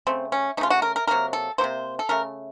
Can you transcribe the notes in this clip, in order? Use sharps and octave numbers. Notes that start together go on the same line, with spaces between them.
C#3 A3 C4
C#4
C#3 A3 D#4 F4
F#4
A#4
A#4
C3 F#3 A#3 A#4
A4
F#3 A#3 C5
C3
A4
C#3 A3 A#4